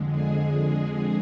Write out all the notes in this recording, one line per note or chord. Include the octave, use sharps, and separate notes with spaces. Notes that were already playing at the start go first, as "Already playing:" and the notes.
Already playing: F2 D3 G#3
G#4